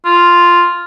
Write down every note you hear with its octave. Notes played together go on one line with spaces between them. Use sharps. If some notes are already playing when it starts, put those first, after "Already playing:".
F4